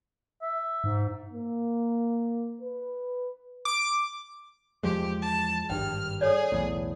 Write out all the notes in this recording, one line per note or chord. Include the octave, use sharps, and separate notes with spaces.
E5
G#2
A#3
B4
D6
E2 F3 G#3 G4
A5
G#1 G2 G5 F6
G#4 A4 C#5 D5
B1 E2 A2